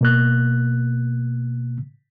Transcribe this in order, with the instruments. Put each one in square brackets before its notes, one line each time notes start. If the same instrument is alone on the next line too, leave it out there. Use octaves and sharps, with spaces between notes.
[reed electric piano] B2 A#3 F#6